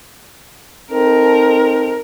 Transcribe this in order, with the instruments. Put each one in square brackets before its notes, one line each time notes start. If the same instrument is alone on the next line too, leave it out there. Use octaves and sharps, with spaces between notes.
[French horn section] C4 D#4 A4 [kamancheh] A#4